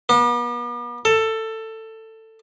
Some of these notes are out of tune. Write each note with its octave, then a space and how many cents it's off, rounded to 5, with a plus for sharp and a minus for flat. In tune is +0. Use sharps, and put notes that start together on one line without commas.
B3 -40
A4 +15